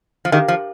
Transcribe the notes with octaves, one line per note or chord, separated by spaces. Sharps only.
F3
D#3 G4 A#4 F5
F3